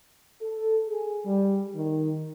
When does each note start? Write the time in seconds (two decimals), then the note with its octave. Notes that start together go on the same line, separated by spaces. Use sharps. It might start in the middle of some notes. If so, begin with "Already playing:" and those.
0.41 A4
0.87 G#4
1.26 G3
1.75 D#3